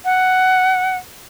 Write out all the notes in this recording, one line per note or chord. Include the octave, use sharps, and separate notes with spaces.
F#5